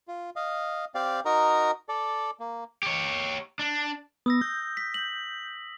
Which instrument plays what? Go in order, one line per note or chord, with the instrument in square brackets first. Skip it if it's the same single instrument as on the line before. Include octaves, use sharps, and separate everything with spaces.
[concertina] F4
D#5 F5
C4 G4 D5 F5
D#4 F#4 A#4 D#5 A#5
A4 D5
A#3
[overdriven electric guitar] G4 C#5
D4
[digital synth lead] B3 [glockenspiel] D#6 E6 A#6
[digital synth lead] G6
[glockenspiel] B6
F#7